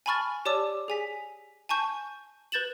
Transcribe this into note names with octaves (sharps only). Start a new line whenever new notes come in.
G#5 A5 B5 C#6 F6 A6
G4 C#5 D5 A5 D6 E6
G#4 G#5 B6
G#5 A5 C#6 G6
B4 G6 A6 E7 F#7